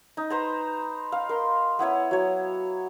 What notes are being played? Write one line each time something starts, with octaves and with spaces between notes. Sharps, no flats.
D#4
B4 C5 A#5
F5
A#4 C6
B3 E4 C#5
F#3 C#5